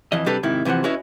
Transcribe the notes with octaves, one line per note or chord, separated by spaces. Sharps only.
F2 E3 D#5
C3 G3 D4 G4 A4 B4
G#2 C3 D#3 E4
C3 E3 F3 C5 F#5
C#4 E4 F#4 B4 C#5 D#5